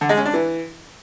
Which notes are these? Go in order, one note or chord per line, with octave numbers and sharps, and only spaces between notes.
D3
G#3
C#4
D4
E3